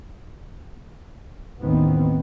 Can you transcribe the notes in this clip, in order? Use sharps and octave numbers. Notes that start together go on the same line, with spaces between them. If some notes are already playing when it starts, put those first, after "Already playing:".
A1 D#2 D#3 B3 C4